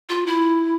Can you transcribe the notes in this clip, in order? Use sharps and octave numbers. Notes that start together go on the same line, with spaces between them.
F4
E4